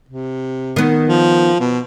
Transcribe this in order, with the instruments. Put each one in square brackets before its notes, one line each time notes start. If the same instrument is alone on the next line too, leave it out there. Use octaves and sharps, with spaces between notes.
[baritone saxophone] C3
[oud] D#3 B3
[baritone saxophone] F3
B2